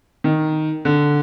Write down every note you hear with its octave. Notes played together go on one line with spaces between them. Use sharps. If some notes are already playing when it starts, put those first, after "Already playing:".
D#3
D3